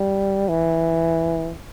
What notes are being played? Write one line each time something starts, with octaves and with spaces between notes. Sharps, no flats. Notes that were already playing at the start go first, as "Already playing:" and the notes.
Already playing: G3
E3